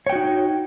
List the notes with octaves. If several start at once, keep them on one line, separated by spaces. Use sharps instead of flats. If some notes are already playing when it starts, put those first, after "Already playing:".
D#4 F#4 C#5 G5